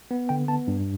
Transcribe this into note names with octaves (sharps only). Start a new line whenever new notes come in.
B3
D3 G5
B3 A5
G2